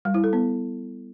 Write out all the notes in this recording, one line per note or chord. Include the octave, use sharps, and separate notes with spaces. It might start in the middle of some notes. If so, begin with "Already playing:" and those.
G3
E4
A4
B3